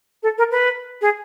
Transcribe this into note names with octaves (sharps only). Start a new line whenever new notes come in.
A4
A#4
B4
G#4